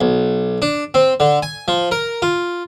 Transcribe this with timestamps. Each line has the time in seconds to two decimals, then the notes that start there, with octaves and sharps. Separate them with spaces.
0.01 B1
0.62 D4
0.94 C4
1.20 D3
1.43 G#5
1.68 F3
1.91 A#4
2.22 F4